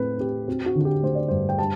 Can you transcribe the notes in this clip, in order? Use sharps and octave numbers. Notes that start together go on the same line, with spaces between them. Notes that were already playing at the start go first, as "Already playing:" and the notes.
Already playing: A2 A3 C4 B4
C4 G4
C4 F#4
F#4
D3
F#4
G4
A3 C5
D5
G2 C5
G5
G3 A5